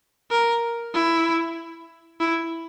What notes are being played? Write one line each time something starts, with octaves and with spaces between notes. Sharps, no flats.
A#4
E4
E4